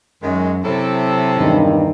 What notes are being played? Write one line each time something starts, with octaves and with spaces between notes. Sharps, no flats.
F#2 D#3 F#3 G#3
C3 F#3 E4 A4
E2 G2 D#3